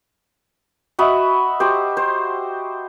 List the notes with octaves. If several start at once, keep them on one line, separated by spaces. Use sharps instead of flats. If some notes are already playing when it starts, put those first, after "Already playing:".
F#4 D#5 E5 B5
F#4 G4 C5
C5